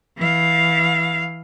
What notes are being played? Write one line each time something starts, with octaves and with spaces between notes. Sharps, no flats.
E3 F5